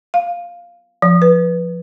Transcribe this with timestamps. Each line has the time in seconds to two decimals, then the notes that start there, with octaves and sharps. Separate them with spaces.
0.14 F5
1.02 F3
1.22 B4